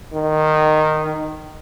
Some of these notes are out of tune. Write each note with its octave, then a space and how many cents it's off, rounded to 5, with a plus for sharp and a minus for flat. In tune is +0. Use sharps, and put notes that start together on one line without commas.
D#3 -10